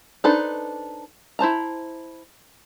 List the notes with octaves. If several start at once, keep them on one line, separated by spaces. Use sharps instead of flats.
D4 D#4 A4 B4 C5
E4 C5 A5 A#5